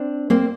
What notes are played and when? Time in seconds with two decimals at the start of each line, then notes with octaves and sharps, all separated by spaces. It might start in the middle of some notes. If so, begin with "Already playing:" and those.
Already playing: C4 D4
0.30 A#3 C4